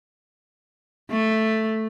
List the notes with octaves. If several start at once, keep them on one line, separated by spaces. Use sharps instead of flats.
A3